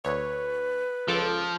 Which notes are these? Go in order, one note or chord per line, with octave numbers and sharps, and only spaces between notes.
D2 B4 C#5
C#2 F3 A4 D6